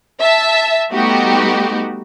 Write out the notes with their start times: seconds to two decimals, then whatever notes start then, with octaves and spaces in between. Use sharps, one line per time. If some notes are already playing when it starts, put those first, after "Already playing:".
0.20 E5 A5
0.91 G3 A3 B3 D#4 F#4 G4